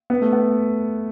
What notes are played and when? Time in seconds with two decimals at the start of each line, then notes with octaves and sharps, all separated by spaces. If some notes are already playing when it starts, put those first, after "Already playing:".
0.10 B3
0.22 A3
0.33 B3